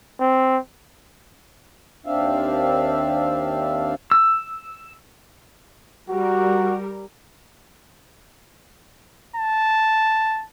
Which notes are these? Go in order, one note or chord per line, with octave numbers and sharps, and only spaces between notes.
C4
D#2 C4 D4 E5 F5
E6
G3 F#4 A#4
A5